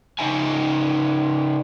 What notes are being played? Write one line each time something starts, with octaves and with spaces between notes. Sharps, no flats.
C#3 D#4 C5 D#5 E5 G#5